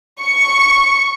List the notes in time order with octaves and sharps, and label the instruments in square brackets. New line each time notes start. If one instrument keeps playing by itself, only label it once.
[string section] C#6